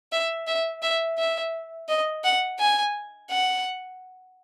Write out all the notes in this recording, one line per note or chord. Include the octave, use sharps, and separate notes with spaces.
E5
E5
E5
E5
D#5
F#5
G#5
F#5